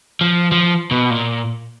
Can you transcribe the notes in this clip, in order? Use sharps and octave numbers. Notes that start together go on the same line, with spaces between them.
F3
F3
B2
A#2